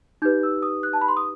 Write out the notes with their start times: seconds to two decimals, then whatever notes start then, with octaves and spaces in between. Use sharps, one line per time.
0.22 D#4 G4 B4 G6
0.43 E6
0.62 D#6
0.83 F#6
0.93 A5
1.01 B5
1.08 C6
1.17 D#6